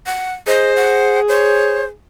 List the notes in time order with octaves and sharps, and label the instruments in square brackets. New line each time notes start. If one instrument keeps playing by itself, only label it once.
[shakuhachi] F#5
[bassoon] G#4 [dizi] C5 [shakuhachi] D#5
[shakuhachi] F#5
[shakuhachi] C5 [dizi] C#5